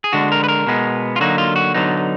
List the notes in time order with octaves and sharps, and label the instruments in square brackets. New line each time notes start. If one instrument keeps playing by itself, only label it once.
[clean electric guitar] G#4
D3 G#3 D4 F#4
A#4
B4
A#4
B2 G#3 B3
F4
D3 F#3 A#3 D#4 F#4
F4
F#4
D3 F#3 B3 D#4